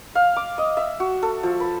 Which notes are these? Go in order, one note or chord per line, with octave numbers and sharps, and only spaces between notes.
F5
D6
D#5
E5
F#4
A4
F3
B4